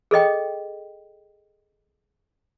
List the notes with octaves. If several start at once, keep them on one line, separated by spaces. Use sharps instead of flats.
G#4 A4 D#5 G5